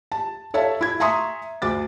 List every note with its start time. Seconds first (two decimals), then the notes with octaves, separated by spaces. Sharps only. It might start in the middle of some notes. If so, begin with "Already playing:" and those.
0.12 A5
0.54 A4 C#5 E5 F5 A5
0.81 E4 G#6
1.00 E5 G#5 A#5 C6 C#6 D#6
1.62 D2 D6 A6